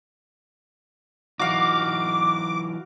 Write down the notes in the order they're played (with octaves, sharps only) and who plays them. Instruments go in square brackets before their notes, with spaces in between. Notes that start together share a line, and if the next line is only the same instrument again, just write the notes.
[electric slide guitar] E3 F#3 D#4 [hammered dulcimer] F#4 F5 [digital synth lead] D6